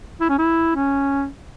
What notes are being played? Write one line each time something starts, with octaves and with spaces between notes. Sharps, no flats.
E4
C#4
E4
C#4